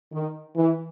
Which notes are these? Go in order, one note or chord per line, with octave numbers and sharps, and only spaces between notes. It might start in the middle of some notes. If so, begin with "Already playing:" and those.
D#3
E3